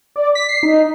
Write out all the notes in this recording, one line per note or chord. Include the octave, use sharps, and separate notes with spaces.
D5
B6
C7
D#4